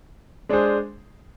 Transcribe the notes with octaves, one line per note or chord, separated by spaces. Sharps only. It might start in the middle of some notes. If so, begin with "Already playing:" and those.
G#3 D4 G#4 C5